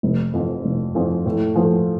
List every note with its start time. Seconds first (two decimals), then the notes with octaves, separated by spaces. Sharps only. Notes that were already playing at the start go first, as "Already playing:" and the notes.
0.03 F1
0.33 F2 F3
0.65 F1
0.95 F2 F3
1.26 A2
1.56 F3 A3